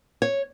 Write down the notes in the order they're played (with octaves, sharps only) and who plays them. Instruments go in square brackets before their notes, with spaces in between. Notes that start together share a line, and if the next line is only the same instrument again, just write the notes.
[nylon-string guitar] C#5